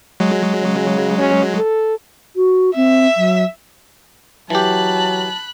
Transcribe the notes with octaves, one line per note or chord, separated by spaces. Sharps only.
F#3 G#3
C#3
C#4
A4
F#4
C4 E5
F#3
E3 F#3 G4 A5 B5 F#6